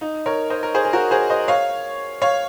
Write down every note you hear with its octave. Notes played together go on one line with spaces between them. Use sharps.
D#4
A#4 C#5
C5 D#5
A#4
G#4 C5
G#4
F#4 A#4
G#4 C5
C5 D#5
C#5 F5
C#5 F5